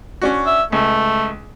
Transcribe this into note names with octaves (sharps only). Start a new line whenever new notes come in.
C#4 D4 F#4
E5
C#2 A3